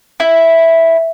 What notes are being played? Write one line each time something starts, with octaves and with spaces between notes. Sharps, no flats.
E4